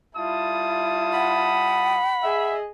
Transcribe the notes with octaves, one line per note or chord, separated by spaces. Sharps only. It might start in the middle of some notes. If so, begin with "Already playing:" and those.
G3 E4 F4 A5 D#6
F#5 B5
G#4 D#5 E5